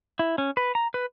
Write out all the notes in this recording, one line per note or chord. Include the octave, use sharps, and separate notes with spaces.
E4
C#4
B4
A#5
B4